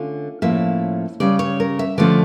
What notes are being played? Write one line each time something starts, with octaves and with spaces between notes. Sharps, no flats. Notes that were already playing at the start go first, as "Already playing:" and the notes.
Already playing: D3 A3 C#4 F4
A2 F3 A#3 C#4 E5
C#3 G3 C#4 D5
C#5
A#4
E5
D3 F3 A3 C#4 D5